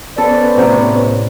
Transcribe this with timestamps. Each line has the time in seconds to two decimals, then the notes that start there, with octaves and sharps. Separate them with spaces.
0.18 B3 C#4 A4 B4 C5 D5
0.57 A2 C3 F#3